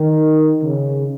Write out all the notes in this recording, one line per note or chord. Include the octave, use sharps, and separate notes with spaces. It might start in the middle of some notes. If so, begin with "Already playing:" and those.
Already playing: D#3
C#3